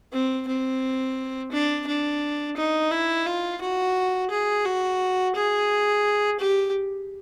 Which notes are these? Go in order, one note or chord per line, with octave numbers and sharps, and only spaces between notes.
C4
C4
D4
D4
D#4
E4
F4
F#4
G#4
F#4
G#4
G4